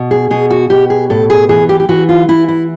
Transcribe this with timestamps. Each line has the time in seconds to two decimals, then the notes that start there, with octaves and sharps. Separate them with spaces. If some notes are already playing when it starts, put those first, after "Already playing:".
Already playing: B2
0.11 G#4
0.31 B2 G#4
0.50 F#4
0.70 B2 G4
0.90 G#4
1.10 A2 A4
1.30 G#4
1.49 E3 G#4
1.69 G4
1.80 G4
1.89 E3 F#4
2.09 F4
2.28 E3 E4
2.48 E4